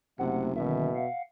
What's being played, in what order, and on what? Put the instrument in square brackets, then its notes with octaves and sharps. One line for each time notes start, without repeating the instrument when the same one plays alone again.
[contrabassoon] F#1 [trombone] C3 [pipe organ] A3 [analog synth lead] F#5
[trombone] B2 [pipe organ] D3 D#3 C#4 [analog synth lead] E5
[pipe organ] F5 F#5